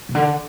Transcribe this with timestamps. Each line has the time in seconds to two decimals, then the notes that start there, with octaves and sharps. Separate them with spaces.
0.09 C#3
0.15 D3